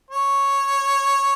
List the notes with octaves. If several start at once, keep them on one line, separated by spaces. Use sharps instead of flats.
C#5